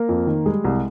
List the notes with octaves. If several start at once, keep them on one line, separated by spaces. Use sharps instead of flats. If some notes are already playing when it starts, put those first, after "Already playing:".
Already playing: A#3 A#4
F2
D#3
G3 G#3 G#4
C2